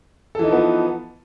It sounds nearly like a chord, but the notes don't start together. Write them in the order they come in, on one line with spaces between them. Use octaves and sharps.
A4 E3 D#4 F3 B3